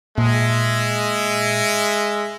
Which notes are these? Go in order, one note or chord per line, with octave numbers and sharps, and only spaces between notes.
A#2 G#3 E5